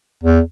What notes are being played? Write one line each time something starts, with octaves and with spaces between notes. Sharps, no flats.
E2